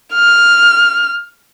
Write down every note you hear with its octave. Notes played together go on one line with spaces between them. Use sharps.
F6